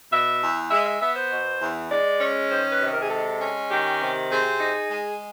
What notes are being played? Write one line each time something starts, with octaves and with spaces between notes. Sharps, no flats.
B2 E5
E2
G#3 E5
E5
B3 E5
C5
B2
E2
G#3 D5
C#4
D#3 C5
B4
C3
A#4
G#4
G#3 A4
C#4
D#3 G4
C3
C4 G#4
D#4
G#3